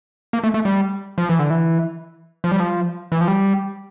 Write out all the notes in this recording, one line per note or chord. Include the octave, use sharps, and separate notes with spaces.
A#3
A3
A3
G3
F3
E3
D3
E3
F3
G3
F3
E3
F3
G3